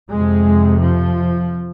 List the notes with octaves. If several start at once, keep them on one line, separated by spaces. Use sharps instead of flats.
F2 C3 G#3
F3